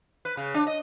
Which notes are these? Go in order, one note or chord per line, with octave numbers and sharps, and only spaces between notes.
B4
C#3
D4
D#5